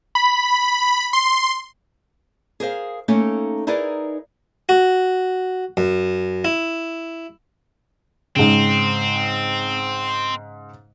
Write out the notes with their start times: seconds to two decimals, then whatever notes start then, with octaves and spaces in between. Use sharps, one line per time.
0.15 B5
1.13 C6
2.60 G#4 A#4 C5 F5
3.08 A3 A#3 C#4 D#4 A4
3.67 D#4 E4 G#4 A#4 B4 D5
4.69 F#4
5.77 F#2
6.45 E4
8.36 G#2 C#3 C4